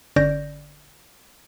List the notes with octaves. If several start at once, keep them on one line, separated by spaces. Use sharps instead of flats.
G1 D3 C#4 D5 G6 A#6